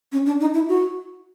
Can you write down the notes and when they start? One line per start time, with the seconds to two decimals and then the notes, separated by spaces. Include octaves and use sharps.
0.12 C#4
0.26 D4
0.41 D#4
0.54 E4
0.69 F#4